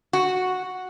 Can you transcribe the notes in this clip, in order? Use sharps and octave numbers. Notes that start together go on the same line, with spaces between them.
F#4